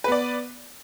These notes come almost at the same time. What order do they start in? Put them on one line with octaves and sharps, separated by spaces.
B4 B3 D5